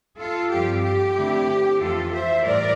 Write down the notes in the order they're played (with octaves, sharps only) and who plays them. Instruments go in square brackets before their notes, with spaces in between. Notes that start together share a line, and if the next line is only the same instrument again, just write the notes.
[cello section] F4 A4
G2 F3 C4 F4 G4
G4
D3 A3 C4 E4
F2 E3 A3 F4 A4
C5 E5
A2 E3 G3 A#4 D5